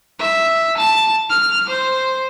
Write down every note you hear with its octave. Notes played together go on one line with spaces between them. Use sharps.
E5
A5
F6
C5